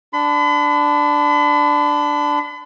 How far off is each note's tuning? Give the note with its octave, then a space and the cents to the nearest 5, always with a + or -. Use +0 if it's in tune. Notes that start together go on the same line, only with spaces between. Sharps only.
D4 +0 B5 +40